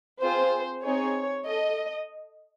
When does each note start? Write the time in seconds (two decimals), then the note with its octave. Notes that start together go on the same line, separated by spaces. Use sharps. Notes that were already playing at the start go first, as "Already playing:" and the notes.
0.22 C4 F4 G#4 C5
0.84 C4 D#4 G#4 C#5
1.45 A4 D#5